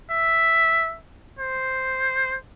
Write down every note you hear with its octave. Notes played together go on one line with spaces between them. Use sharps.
E5
C5